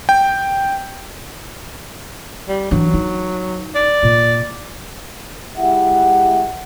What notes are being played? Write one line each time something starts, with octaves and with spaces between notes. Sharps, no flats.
G5
G3
E3 F#3 D4
D#4
D5
A#2
G#3 E4 G4 E5 F#5